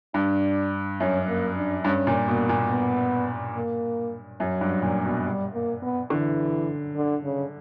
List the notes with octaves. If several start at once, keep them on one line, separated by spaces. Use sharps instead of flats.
G2 D4
F#2 C#4
A#3
D4
G2 C#4
A#2
B2 A#3
A#2
B3
A#3
F#2 F#3
G2
A#2
B2
G3
A#3
B3
D3 E3
D3
C#3